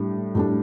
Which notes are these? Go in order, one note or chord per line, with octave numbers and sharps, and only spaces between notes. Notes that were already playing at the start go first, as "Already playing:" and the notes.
Already playing: A2 G3 D4
A2 G3 D4